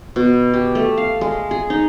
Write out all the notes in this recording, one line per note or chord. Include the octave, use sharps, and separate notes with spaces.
B2
G4
A3
F5
G#3
G#4
D#4